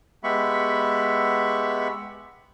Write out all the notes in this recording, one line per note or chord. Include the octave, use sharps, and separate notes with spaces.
G#3 B3 G4 E5 B5 C#6